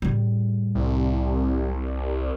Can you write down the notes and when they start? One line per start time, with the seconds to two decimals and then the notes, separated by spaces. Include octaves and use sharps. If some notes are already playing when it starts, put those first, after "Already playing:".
0.02 A2 G3
0.75 C2